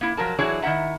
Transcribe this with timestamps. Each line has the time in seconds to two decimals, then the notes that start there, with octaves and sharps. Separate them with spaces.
0.01 A#3 E4
0.17 F3 F#3 A#4 A5
0.38 E3 F#3 D4 E4 G#4 C#5
0.62 D#3 E4 E5 F#5 A#5